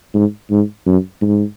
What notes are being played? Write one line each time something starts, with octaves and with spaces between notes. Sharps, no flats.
G#2
G#2
F#2
G#2